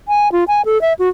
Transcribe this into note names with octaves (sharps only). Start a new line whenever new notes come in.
G#5
F4
G#5
A4
E5
F#4